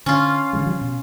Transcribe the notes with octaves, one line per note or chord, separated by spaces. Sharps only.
D3 C#4 F4
D3 F3 G#3
C#3 F3 G3
B2